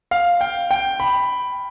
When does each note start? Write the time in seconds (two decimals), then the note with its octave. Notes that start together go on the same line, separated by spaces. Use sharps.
0.11 F5
0.41 G5
0.71 G5
1.00 B5